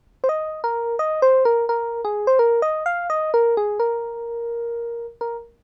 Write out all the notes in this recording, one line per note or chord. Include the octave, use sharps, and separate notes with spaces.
C5
D#5
A#4
D#5
C5
A#4
A#4
G#4
C5
A#4
D#5
F5
D#5
A#4
G#4
A#4
A#4